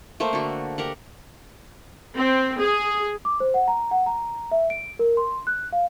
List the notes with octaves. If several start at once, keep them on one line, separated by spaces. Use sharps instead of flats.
A3 A#3 C5
D3 F#4
G4 A#4 F#5
C4
G#4
D6
C5
F#5
A#5
F#5
A#5
E5
D7
A#4
C6
F#6
F5